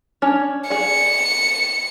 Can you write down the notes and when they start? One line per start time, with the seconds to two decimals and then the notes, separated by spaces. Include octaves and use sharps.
0.22 C#4 D4 C#5
0.70 G#4 D5 C#7